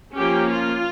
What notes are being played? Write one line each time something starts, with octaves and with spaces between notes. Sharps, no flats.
F3 A#3 C#4 G4
F4